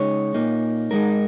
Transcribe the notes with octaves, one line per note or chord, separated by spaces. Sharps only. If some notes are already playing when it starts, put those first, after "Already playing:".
Already playing: C#3 G#3 D#4 C#5
A#2 A#3 D#4
G#2 G#3 D#4 A#4